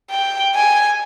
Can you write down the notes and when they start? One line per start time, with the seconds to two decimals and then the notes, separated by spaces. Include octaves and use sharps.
0.10 G5
0.55 G#5